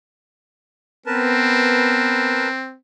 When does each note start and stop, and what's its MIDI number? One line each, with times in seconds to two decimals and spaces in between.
1.06 2.48 59
1.06 2.76 60
1.06 2.49 70
1.06 2.49 71
1.06 2.49 81